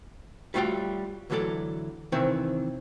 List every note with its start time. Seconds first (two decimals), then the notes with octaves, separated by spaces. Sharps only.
0.54 G3 A3 F4 F#4 C#5 G5
1.30 D2 E3 F#3 G#4 A4 D5
2.12 C3 D#3 E3 C4 C#5